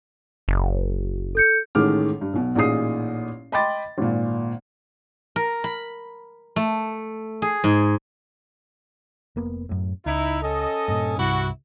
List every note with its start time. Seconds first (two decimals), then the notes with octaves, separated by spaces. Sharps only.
0.48 F#1
1.35 A4 G6 C#7
1.75 A1 A2 D#3 G#3 D6 F6
2.21 G2
2.33 B1 B2
2.55 A1 A#2 D#4 G#4 D#6 C7
3.52 D#5 G5 B5 C6 D6 A6
3.98 G#1 A#2
5.36 A#4
5.64 B5
6.56 A3
7.42 G#4
7.64 G#2
9.36 F1 A#3 B3
9.69 F#2 A2
10.06 C#2 D#4 E4
10.42 C#4 A4 D#5
10.88 G2 A#2
11.18 C2 G2 C3 E4 F#4